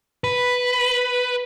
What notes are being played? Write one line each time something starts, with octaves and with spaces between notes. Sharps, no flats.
B4